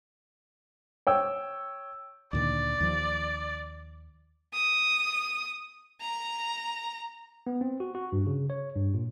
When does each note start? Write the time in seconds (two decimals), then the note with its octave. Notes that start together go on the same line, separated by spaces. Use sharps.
1.07 C#5 G5 E6
2.33 D2 A#2 D#3 D5
2.80 D#2 F3
4.54 D#6
6.01 A#5
7.47 B3
7.61 C4
7.80 F#4
7.95 F#4
8.12 G2
8.26 C#3
8.50 C#5
8.75 G2
8.94 A#2